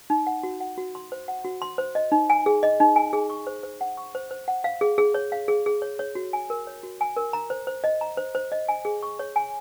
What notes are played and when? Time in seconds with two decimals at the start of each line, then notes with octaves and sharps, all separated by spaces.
0.10 D#4
0.27 F#5
0.43 F#4
0.60 F#5
0.78 F#4
0.95 C6
1.12 C5
1.28 F#5
1.44 F#4
1.62 C6
1.78 C5
1.95 D#5
2.12 D#4
2.30 G#5
2.46 G#4
2.63 D#5
2.80 D#4
2.96 G#5
3.13 G#4
3.30 C#6
3.47 C5
3.63 C5
3.81 F#5
3.97 C#6
4.15 C5
4.31 C5
4.48 F#5
4.64 F5
4.81 G#4
4.98 G#4
5.14 C#5
5.32 F5
5.48 G#4
5.66 G#4
5.82 C#5
5.99 C#5
6.15 F#4
6.33 G#5
6.50 A#4
6.67 C#5
6.83 F#4
7.01 G#5
7.17 A#4
7.33 A#5
7.50 C5
7.67 C5
7.84 D#5
8.01 A#5
8.17 C5
8.35 C5
8.52 D#5
8.68 G#5
8.85 G#4
9.03 C#6
9.19 C#5
9.36 G#5